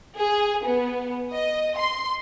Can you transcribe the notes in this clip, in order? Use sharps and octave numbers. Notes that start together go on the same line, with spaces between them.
G#4
B3
D#5
C6